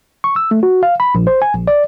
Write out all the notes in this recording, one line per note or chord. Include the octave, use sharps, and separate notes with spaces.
C#6
E6
A3
F#4
F5
B5
A#1
C5
G#5
A#1
D5